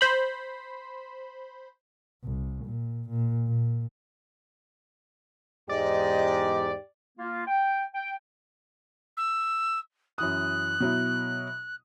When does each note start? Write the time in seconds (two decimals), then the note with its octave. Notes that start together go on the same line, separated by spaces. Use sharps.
0.01 C5 B5
2.24 C2
2.65 A#2
3.09 A#2
3.47 A#2
5.69 E2 G#2 G4 D5 D#5
7.18 A#3 F4
7.47 G5
7.94 G5
9.17 E6
10.18 F#2 E3 D#6 F#6
10.80 B2 F#3 E4